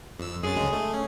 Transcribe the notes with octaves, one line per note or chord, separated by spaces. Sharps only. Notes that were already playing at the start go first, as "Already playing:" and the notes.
F2 E6
F#2 G#4 A6
D2 C#3 G#3
A3
C#4